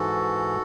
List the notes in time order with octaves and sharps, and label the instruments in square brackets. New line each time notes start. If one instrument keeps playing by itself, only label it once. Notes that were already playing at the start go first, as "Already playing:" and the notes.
Already playing: [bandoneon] G#2 E3 F#4 A4